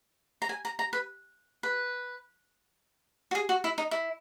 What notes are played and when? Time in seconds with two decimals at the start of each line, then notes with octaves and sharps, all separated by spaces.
0.42 A#5
0.49 G#5
0.65 A#5
0.79 A#5
0.93 B4
1.63 B4
3.31 F#4
3.35 G#4
3.49 F#4
3.64 E4
3.78 D#4
3.91 E4